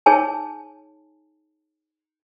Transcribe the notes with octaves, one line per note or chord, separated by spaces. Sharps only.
D#4 G#4 C#5 G#5 A5